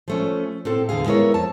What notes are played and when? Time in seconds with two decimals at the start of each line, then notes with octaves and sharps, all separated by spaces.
0.08 F3 A3 C#4
0.65 A2 C4 A4
0.89 E2 D3 E3 G#4 F5
1.06 G#3 B3 E4 A#4 C#5
1.34 F2 A5